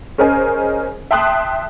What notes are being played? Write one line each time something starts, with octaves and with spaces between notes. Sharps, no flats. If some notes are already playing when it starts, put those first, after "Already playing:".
C#4 G#4 A#4 C5 D#5 G#5
E5 G5 A5 C6 D#6 F#6